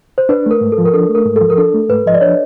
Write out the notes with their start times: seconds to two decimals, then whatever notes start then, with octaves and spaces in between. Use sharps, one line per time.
0.18 C5
0.29 D4 B4
0.46 A3 A#4
0.61 G#2
0.72 A4
0.78 F3
0.86 A#4
0.93 D4 A4
1.09 A3
1.15 A#4
1.25 G#2
1.36 A4
1.41 F3
1.50 A#4
1.57 D4 A4
1.74 A3
1.89 G#2 B4
2.06 F3 D#5
2.14 D5
2.21 D4 C#5